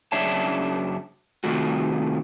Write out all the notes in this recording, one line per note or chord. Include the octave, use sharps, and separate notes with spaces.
F#2 C#3 D4 C#5 E5 A5
C3 D#3 A3 F4 F#4